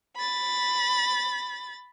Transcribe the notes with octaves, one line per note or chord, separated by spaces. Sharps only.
B5 A6